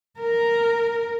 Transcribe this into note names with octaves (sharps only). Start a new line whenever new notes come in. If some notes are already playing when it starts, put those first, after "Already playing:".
A#4